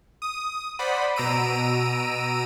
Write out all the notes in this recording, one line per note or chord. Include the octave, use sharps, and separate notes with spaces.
D#6
C5 D5 F#5 B5
B2 A#5 E6 D7 D#7